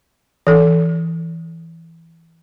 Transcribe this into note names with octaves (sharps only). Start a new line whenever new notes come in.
E3 A4